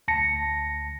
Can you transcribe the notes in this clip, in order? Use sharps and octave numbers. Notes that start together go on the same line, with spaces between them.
D2 A5 A#6 C#7